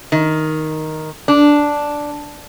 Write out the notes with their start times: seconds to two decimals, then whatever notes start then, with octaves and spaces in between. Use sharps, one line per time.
0.12 D#3
1.28 D4